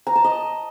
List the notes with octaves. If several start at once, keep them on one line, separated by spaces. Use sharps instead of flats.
A#5
A5
D#5